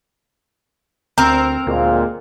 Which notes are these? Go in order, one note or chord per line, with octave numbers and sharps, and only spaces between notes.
D2 C4 A#4 A#5
D2 A#2 G#3 A#3